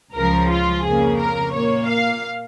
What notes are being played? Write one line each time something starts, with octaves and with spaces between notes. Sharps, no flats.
C#2 C#3 F3 A#4
F4
F2 C#3 A#3 G#4
A#4
A#2 A#3 C#5
F5